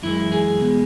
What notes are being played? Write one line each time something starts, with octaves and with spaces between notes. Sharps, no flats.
F#2 E3 G#3 E4
G#4
B2 G#3